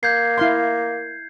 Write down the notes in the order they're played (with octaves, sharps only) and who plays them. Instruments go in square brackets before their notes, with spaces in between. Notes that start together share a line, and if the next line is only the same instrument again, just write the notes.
[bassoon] A#3 [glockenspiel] G6 G#6 C7
[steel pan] E4 F5 C6